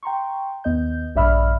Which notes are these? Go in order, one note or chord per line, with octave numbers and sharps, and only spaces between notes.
G5 A#5 C6 C#6
D#2 B3 D#5 G6
A#1 G2 D5 E5 B5 F6